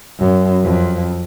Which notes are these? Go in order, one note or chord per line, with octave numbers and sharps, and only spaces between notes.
F#2
F2